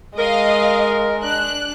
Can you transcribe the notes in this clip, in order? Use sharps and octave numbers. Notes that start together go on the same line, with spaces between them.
G#3 A#4 D#5 F5
D4 F#6